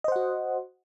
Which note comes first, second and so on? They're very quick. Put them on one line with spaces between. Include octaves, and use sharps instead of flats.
D#5 C5 F#5 F#4